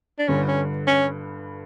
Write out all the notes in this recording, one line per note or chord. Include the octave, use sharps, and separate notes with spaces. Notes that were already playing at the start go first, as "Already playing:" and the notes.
D4
G1 G2 D3 C#4
C#4
C#4